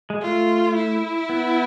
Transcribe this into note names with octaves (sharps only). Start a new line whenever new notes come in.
G#3
A3 F4
E4
B3